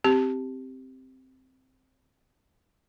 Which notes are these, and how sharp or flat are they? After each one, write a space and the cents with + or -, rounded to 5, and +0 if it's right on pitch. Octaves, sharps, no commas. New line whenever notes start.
C4 +0 G4 +0